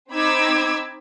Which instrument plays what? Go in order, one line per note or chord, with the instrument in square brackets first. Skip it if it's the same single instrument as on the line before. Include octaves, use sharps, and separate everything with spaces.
[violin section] C4 D#4 B5 D6 E6 G#6